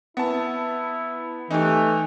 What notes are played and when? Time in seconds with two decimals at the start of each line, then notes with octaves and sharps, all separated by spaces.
0.17 B3 E4 A5
1.51 E3 A3 D#4 G4